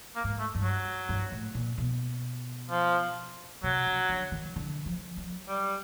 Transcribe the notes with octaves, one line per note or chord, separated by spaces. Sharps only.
A#3
G#2
A3
G2
F#3
G2
A2
A#2
B2
F3
C3 F#3
C#3
D3
D#3
D3
F3
F#3
G3